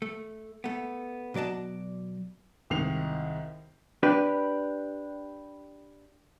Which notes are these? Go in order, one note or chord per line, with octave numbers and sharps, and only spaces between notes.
A3
A3 B3
B2 F#3 D5 D#5 A5
C2 G#2 D#3 C7 F7
D4 G4 B4